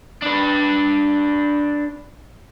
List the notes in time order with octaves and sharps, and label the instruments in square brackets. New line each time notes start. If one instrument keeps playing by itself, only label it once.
[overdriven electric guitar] D4 B4